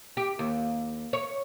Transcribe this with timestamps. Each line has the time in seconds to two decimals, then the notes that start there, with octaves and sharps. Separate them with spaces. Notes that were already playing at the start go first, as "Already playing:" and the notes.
0.17 G4
0.39 D#2
1.13 C#5